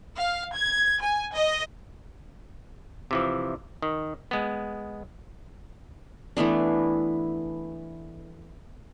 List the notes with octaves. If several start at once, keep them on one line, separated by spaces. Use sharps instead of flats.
F5
G#6
G#5
D#5
C3 E3 F3
D#3
G#3 B3
E3 A3 B3 D4